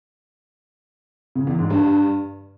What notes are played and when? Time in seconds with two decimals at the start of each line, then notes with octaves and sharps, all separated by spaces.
1.35 C#3
1.47 E2
1.59 G#2
1.70 G2